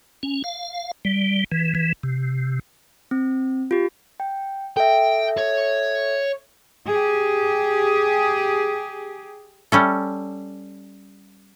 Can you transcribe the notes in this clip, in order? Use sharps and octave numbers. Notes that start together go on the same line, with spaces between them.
C#4
F5
G3
E3
E3
C3
C4
F4 G4
G5
A4 E5 G5
C#5
G4 G#4
G3 C#4 A4